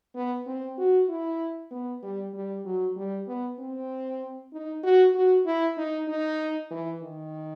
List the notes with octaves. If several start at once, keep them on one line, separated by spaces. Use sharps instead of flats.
B3
C4
F#4
E4
B3
G3
G3
F#3
G3
B3
C4
D#4
F#4
F#4
E4
D#4
D#4
E3
D#3